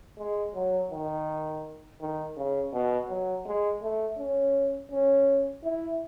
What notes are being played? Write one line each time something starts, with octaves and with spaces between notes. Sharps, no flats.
G#3
F#3
D#3
D#3
C#3
B2
F#3
G#3
A3
C#4
C#4
E4